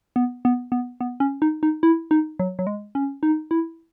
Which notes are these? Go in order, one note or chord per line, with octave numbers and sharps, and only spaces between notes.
B3
B3
B3
B3
C#4
D#4
D#4
E4
D#4
F#3
F#3
G#3
C#4
D#4
E4